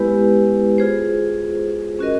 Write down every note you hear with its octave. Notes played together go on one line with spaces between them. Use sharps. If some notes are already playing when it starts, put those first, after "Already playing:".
Already playing: G#3 B3 E4 G4 B4
F4 G#4 C5
C#4 F#4 A#4 D#5